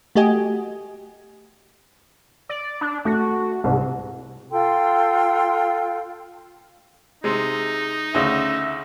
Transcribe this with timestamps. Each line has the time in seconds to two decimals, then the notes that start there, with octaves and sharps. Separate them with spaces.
0.16 A3 F#4 G4 D#5 G#5
2.49 D5
2.81 D4
3.05 A3 F#4
3.64 C2 G#2
4.51 F4 A4 G5 C6
7.24 C3 G#3 D#4
8.14 D2 C#3 E5